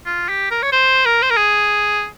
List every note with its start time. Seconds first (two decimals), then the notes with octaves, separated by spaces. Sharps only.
0.06 F4
0.29 G4
0.51 A#4
0.63 C#5
0.72 C5
1.05 A#4
1.22 C5
1.30 A#4
1.37 G#4